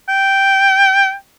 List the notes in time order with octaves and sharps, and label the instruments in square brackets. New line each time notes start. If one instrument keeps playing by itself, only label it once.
[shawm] G5